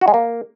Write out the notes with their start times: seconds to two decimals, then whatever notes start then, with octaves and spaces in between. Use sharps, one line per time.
0.01 F#4
0.08 G#3
0.14 A#3